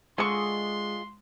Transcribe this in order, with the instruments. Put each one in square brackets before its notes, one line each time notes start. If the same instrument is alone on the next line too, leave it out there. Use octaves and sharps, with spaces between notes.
[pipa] D3 C#6 [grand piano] G#3 [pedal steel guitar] F4 G#4 D#5 [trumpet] C6